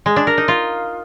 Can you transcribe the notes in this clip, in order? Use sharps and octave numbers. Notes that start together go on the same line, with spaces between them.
G#3
D4
A#4
D#4
F4